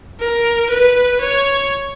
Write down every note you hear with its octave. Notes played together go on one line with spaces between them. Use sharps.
A#4
B4
C#5